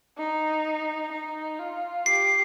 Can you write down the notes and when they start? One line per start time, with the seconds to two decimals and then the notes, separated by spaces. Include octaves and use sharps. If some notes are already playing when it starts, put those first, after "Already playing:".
0.18 D#4
1.12 D#4
1.59 F4
2.06 G4 C7